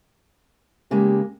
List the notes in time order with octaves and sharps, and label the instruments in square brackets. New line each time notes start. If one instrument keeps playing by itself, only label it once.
[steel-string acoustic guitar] C#3 G#3 A#3 [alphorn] G4